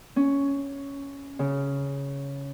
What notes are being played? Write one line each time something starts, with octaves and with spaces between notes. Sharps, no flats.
C#4
C#3